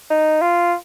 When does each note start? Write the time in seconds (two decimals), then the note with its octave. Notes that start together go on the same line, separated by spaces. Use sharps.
0.10 D#4
0.42 F4